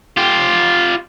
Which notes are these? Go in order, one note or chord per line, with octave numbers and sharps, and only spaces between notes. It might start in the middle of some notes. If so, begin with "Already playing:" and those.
F4 G4